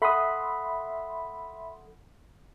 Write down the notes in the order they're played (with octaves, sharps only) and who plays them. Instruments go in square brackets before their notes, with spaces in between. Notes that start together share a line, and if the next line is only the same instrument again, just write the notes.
[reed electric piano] A4 F#5 D#6 [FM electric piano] E5 B5 C6